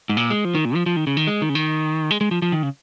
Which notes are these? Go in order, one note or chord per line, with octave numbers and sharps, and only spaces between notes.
G#2
A#2
G#3
F3
D#3
A#2
F3
F3
D#3
C#3
D#3
G#3
D#3
C#3
D#3
G#3
G#3
F3
F3
D#3
C#3